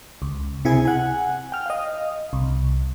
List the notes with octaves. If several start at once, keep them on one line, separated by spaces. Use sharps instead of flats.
C#2
C3 E4 G#4 G#5
F#5 G#5
G5 F6
D#5 F5
C2